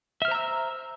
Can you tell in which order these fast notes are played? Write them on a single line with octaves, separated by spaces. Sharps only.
E5 F6 C5 A#5 E6